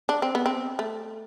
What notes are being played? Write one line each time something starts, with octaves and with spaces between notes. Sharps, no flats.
D4
C4
B3
C4
A3